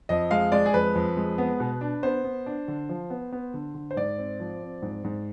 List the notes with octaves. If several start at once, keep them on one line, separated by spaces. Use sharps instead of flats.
F2 D#5
G#3 F5
G#3 D5
G#4
F2 B4
F2
G#3
B3
B2
D4
B3 C5
B3
D4
D3
F3
B3
B3
D3
D3
C5
G#2 D5
C4
F3
C4
G#2
G#2